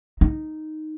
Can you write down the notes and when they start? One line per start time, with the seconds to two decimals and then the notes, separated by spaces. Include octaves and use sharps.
0.21 D#4